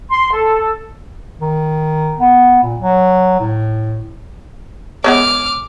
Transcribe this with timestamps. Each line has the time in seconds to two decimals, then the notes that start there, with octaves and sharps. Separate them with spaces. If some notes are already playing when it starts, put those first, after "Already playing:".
0.10 C6
0.32 A4
1.40 D#3
2.19 B3
2.63 A#2
2.80 F#3
3.40 A2
5.04 G#3 B3 C#5 D6 F6